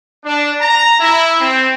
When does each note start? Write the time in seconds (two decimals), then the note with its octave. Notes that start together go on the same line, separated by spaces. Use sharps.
0.24 D4
0.60 A#5
0.99 E4
1.40 C4